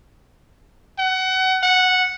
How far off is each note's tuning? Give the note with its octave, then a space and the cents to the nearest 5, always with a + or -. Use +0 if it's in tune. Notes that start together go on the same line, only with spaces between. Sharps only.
F#5 +25
F#5 -5